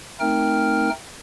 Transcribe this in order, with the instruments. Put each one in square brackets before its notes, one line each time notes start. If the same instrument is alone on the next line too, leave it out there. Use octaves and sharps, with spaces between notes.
[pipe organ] A3 C4 D#4 A#4 G5 F6